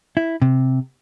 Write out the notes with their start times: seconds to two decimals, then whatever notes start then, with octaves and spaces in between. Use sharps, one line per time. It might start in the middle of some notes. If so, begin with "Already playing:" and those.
0.17 E4
0.42 C3